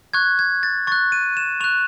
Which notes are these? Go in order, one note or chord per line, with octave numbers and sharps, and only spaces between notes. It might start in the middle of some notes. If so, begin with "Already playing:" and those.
C#6 F#6 G#6
G#6
A6
C#6 F#6 A6
D#7
E7
C#6 F#6 F7